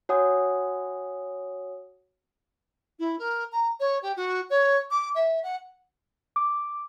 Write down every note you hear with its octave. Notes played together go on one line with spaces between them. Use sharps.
F#4 C#5 F#5 G#5 D#6
E4
A#4
A#5
C#5
G4
F#4
C#5
D6
E5
F#5
D6